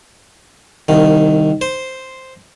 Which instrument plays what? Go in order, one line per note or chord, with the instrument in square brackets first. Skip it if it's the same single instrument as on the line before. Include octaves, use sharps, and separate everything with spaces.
[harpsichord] C2 D#3
C5